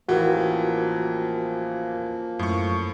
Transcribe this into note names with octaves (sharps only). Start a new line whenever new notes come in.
A1 E3 F3 A#3 F#4 G4 A#4 G5
F#2 A2 C#6